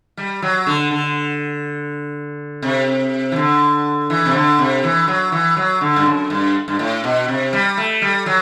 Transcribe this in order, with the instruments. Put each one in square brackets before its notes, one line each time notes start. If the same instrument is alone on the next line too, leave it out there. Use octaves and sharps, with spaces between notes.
[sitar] G3
F#3
D3
D3
C3
E3
D3
E3
C3
D3
C3
E3
F#3
E3
F#3
D3
G2
F#2
G2
G2
A2
B2
C3
G3
A3
G3
F#3